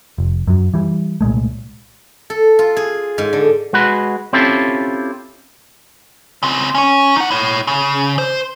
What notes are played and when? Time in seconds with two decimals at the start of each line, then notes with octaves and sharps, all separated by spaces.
0.18 F1
0.47 F#2 F#3
0.74 E3 G3
1.21 C2 A#2 G#3 A3
2.30 A4
2.59 F4
2.77 G#4
3.18 G#2
3.33 D3
3.73 G#3 F#4 B4
4.33 C4 C#4 E4 F4 G4 A4
6.43 C#3 C4
6.75 C#4 C#5
7.17 D#4 F#5
7.30 E4 C#5
7.67 C#3
8.18 C5